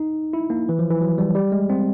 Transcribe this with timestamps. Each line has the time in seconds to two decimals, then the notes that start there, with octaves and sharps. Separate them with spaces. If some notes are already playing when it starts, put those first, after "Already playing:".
Already playing: D#4
0.33 E4
0.50 A#3
0.69 E3
0.79 F3
0.90 E3
1.01 F#3
1.18 G3
1.35 G3
1.52 G#3
1.70 C4